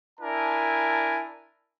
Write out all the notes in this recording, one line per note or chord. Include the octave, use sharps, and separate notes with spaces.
D4 E4 A#4 G#5 A5